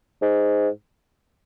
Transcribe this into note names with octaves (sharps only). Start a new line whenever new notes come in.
G#2